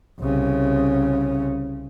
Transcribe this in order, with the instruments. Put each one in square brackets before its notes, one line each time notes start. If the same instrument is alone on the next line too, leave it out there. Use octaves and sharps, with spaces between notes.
[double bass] C2 C#3